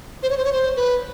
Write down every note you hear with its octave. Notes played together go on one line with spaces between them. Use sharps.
C5
C#5
C5
C#5
C5
B4